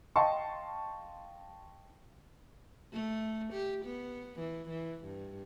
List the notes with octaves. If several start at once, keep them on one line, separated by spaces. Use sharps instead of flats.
D#5 F5 G5 A5 C6 C#6
A3
G4
B3
E3
E3
G2